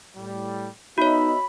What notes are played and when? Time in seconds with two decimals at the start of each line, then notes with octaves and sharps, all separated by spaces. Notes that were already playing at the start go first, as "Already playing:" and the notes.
0.16 A2 G3
0.98 B3 D#4 F#4 C#5 D#5 E5 B5